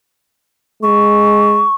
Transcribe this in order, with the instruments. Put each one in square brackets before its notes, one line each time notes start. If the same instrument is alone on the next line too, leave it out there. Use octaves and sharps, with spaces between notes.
[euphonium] G#3 [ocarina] C#6